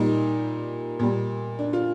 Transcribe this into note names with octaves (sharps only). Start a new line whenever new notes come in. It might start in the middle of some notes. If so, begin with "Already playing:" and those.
Already playing: A#2 G3 D#4
A#2 G3
D4
F4